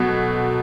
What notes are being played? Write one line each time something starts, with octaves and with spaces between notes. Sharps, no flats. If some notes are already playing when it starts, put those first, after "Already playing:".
Already playing: B2 F#3 A3